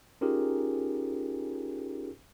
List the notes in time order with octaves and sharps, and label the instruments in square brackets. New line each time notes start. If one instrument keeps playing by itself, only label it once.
[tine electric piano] C#4 D#4 F4 G4 G#4 A#4